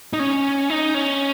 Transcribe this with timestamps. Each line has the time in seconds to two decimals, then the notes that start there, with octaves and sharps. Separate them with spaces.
0.13 D#4
0.19 C#4
0.70 D#4
0.94 C#4